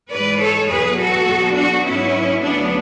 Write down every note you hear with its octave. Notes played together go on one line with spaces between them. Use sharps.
G#2 E3 G#3 B4 D5
A4 C#5
E2 B2 F#3 G#4 B4
F#4 A4
E2 B2 F#3 B3
D4 F#4
G#2 F#3 B3 C#4 E4
D2 C#3 F#3 B3 D4